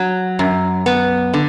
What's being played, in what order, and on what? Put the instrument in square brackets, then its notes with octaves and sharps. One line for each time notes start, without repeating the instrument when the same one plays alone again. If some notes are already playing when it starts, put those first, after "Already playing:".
Already playing: [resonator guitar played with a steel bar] F#3
F#2
B3
D3